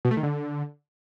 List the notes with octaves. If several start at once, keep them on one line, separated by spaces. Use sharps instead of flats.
B2
A3
D#3
D3